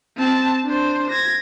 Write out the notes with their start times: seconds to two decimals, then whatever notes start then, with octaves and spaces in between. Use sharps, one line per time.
0.17 C4 A5
0.65 D4 C5
1.10 G#6 A#6